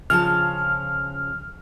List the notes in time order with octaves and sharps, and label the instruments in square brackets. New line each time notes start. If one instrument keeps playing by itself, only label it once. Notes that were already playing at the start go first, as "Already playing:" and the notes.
[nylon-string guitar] C#3 F3 A5 [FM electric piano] F6